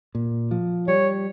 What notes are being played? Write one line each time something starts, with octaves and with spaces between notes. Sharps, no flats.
A#2
F3
G3 C#5